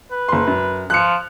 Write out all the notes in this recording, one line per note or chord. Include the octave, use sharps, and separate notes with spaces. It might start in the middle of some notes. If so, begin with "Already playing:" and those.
B4
F#1 C6
F#2
F3 F#6 C#7